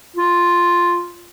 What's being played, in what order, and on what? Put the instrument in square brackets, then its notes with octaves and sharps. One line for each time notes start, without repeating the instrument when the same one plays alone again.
[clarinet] F4